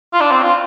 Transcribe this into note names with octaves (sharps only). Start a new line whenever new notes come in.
F4
D4
C4
F4